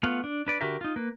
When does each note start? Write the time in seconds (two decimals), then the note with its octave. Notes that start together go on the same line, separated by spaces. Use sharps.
0.03 A3 B3 F4 F5 F#5
0.24 D4
0.47 D4 B4 D5
0.61 D3 F#4 G4 A#4 E5
0.81 D#4 F4
0.96 A#3 B4